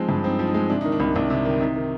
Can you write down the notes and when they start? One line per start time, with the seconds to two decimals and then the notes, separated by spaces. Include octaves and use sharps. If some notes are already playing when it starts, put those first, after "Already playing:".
Already playing: F3 G#3 C4 D#4
0.09 G2
0.24 C4 D#4
0.39 F3
0.47 D#4
0.55 G#3
0.69 C3 D4
0.81 D#3 D#4
0.92 D4
1.00 C2 D#4
1.15 C2 D4
1.30 C3
1.45 D#3
1.60 C3 D#4
1.76 D#3